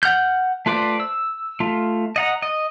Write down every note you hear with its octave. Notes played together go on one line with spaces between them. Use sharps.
F#5 F6 G6
A3 F4 B4 C5 D5
E6
A3 F4
D#5 F#5 A#5
D#5